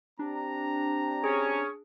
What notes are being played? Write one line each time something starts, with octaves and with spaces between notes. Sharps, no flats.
C4 D4 G4 A#5
C#4 G#4 C#5